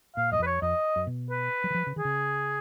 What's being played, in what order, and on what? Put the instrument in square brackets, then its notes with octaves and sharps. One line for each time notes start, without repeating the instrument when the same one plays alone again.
[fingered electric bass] A#2 [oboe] F5
[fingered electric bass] F#2 [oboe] D#5
[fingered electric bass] F2 [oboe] B4
[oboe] C#5
[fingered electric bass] F2 [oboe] D#5
[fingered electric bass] F#2
B2
[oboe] B4
[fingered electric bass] F#3
D#3
F3
C#3
[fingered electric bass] D#3 [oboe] G#4
[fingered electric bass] C#3